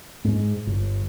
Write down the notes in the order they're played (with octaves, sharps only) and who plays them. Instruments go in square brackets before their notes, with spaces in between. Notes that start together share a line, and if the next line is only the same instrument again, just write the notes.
[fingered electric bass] G#2
G1